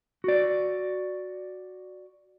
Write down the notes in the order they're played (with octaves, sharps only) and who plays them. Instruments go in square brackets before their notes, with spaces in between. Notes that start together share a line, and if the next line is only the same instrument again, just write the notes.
[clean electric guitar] F#4 D5